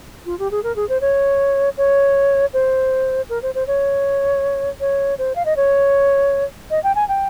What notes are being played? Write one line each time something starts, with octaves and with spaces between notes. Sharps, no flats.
F4
G4
G#4
A#4
G#4
C5
C#5
C#5
C5
A#4
C5
C5
C#5
C#5
C5
F5
D#5
C#5
D#5
G5
G#5
G5